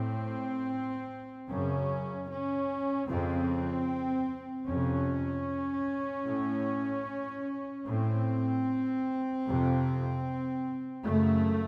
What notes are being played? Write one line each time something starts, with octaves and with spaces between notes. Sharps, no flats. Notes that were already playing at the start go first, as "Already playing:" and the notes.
Already playing: A2 C4
F#2 C#3 C#4
C#4
F2 C#3 C4
F2 C3 C#4
A2
A2 C4
F2 C3
F#2 C#3 A3